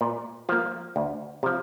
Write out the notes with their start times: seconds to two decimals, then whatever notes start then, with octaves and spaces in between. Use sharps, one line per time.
0.01 A#2
0.49 F3 A#3 F4
0.96 D2
1.43 C3 F3